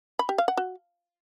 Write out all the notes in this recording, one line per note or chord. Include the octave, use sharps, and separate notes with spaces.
B5
G4
F5
F#5
F#4